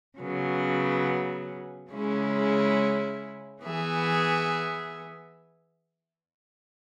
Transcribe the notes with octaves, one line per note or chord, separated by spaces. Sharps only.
C#3 F#3 B3
C#3 G#3 C#4 E4
E3 B3 G#4 E5